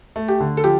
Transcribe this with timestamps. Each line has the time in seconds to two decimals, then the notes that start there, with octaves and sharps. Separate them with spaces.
0.16 A3
0.28 G4
0.40 D3
0.57 A4
0.64 F3 G4